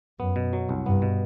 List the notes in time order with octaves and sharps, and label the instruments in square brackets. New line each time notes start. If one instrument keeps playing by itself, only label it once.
[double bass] F#2 [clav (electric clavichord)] B3
[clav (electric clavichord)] B2
F#3
C2
[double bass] G2 [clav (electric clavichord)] B3
[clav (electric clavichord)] B2